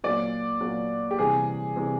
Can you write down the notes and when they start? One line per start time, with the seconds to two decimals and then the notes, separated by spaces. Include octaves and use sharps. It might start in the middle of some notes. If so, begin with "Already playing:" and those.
0.04 A#2 F#3 D5
0.61 A#2 F#3
1.11 G4
1.19 C3 E3 G3 G#4
1.76 C3 E3 G3